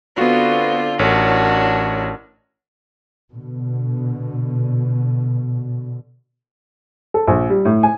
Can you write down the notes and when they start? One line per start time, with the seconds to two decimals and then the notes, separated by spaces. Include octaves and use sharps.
0.18 D3 B3 C4 F4 F#4
0.99 A1 D4 F#4 A#4 C#5
3.33 B2 D3
7.14 A4
7.27 A#1
7.50 G3
7.65 A2
7.83 G#5